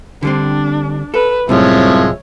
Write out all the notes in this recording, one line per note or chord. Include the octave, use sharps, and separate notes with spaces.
D3 G3 C4 D4
A4 B4
C2 F#2 A2 C3 F3 G#3 C#5 E5